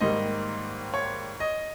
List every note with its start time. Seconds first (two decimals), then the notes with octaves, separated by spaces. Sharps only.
0.01 G#2 D#3 G3 A#3 D#5
0.94 C#5
1.40 D#5